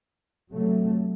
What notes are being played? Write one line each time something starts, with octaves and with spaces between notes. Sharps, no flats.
C3 F#3 A3